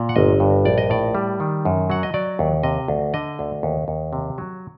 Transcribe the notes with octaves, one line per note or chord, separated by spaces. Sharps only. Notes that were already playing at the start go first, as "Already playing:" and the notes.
Already playing: A#2
F#5
G1 D#5
G2
A#1 D5
D#5
A2 D5
G3
D#3
F#2
F#3 F#5
D#5
F#3 D5
D#2
C3 D#5
D2
D3 D#5
D2
D#2
D#2
C3
F#3